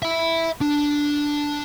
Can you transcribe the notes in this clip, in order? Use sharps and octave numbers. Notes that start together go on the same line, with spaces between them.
E5 B5
D4